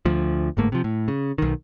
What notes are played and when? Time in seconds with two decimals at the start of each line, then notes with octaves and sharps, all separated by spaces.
0.05 D2 F3
0.57 G1 G#2 A3 A#3
0.72 C3 F3
0.84 A2
1.08 C#3
1.38 B1 D#3